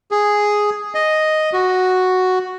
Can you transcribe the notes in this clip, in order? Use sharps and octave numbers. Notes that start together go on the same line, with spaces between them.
G#4
D#5
F#4